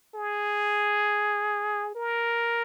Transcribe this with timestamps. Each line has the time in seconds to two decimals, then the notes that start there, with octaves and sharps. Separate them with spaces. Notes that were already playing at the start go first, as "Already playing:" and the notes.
0.15 G#4
1.95 A#4